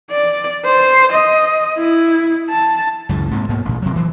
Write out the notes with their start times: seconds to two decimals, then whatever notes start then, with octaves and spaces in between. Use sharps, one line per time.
0.11 D5
0.65 C5
1.12 D#5
1.78 E4
2.49 A5
3.09 C#2 F#2 C#3 E3
3.31 G#2 C3 A#3
3.49 G#2 A#3 B3
3.65 A1 A#2
3.82 C3 F#3
3.96 E3 F#3